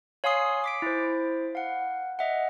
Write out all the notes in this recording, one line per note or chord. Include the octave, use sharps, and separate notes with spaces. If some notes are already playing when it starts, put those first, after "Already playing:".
C#5 F5 G#5 C6 D#6 C7
D6 B6 D7
E4 C5
F5 F#5
D#5 E5 F#5